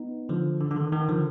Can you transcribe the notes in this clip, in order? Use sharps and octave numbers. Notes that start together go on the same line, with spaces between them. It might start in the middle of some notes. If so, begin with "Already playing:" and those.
Already playing: B3 D#4
D3 F3
D3
D3
D#3
D#3
D3 F3